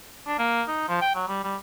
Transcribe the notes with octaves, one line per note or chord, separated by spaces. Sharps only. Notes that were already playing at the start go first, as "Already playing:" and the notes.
D4
A#3
D#4
F3
G5
F#3
G3
G3